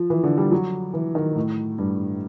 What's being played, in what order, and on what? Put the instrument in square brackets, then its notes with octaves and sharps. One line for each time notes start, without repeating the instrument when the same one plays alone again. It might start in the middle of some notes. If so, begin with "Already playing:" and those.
Already playing: [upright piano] F3
E3
D3
G3
F#3
E3
D#3
A2
G2